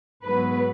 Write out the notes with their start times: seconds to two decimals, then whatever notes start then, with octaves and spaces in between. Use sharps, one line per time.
0.24 G#2 F#3 B3 B4